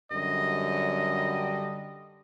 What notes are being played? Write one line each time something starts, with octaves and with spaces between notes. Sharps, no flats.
F#2 D3 G3 D#5